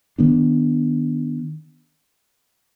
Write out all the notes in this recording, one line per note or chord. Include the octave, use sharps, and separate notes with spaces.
D#3 B3 D4